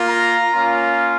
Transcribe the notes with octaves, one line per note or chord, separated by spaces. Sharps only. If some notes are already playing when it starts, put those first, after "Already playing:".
Already playing: A#3 F4
A#5
A#3 C#4 F4